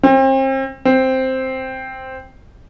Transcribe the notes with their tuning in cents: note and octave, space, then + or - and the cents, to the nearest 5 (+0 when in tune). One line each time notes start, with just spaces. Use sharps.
C4 +35
C4 +0